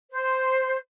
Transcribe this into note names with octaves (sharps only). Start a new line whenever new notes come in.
C5